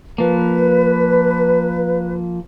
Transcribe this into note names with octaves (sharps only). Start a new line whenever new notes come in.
F3 A#3 B4